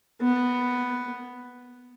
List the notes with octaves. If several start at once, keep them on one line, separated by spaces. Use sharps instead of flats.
B3